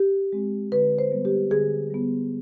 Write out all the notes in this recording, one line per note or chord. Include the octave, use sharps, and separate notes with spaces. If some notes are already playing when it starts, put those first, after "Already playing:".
Already playing: G4
G#3 C4
D3 B4
C5
G3 B3
G4
D3 G#4
G3 B3